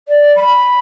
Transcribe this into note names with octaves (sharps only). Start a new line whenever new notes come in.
D5
B5